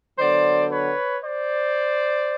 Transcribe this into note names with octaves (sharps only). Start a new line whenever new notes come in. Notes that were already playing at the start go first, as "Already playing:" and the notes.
D3 F#3 B3 C5 D5
B4 C#5
C5 D5